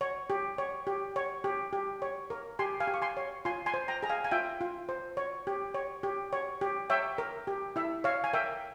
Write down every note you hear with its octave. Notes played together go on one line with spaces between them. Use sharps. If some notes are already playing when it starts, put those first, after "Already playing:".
C#5
G4
C#5
G4
C#5
G4
G4
C#5
A#4
G4 G#5 C6
F5 G#5
G4
C#6
G#5 C6
C#5
F4 G#5 C6
G#5 C6
C5
G5 A#5
G#4 A#5
F5 G#5
G#5
F4 E5 G5
F4
C5
C#5
G4
C#5
G4
C#5
G4
C#5 E5 G5
A#4
G4
E4 E5
C#5 F5
G#5
A#4 E5 G5